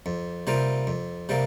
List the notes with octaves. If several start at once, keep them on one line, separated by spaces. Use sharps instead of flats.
F2
C3 G3 A#3 F4
F2
C3 G3 A#3